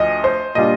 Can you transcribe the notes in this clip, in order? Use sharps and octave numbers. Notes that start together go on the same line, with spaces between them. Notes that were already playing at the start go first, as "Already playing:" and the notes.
Already playing: D2 F3 D#5
C5
A#2 G3 D4 F4 D#5